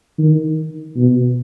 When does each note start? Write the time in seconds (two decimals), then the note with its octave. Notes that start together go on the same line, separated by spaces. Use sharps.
0.19 D#3
0.97 B2